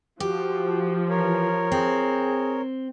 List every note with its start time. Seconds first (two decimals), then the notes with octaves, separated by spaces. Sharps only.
0.20 F3 F#4 G4
1.09 E3 A#4 C#5
1.72 C4 G#4